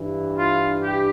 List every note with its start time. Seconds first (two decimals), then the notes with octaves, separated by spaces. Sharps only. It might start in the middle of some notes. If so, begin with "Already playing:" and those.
Already playing: G2 E3
0.36 F4
0.80 G4